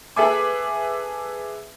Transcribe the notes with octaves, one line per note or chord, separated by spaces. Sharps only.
G#4 A4 B4 E5 G#5 D6